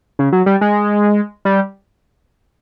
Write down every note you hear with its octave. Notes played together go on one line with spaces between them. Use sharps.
C#3
F#3
G3
G#3
G3